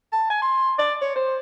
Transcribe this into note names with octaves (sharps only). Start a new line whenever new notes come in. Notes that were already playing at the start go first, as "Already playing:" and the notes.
A5
G#5
C6
D5
C#5
C5